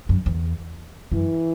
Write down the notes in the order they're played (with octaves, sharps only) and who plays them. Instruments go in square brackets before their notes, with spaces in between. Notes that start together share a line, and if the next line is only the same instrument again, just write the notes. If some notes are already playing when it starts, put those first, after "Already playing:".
[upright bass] F#2
E2
[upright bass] F#2 [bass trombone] E3